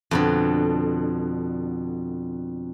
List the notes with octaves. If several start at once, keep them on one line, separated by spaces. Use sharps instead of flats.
F2 B2 D3